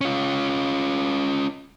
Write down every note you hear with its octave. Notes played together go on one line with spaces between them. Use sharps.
C#4 F4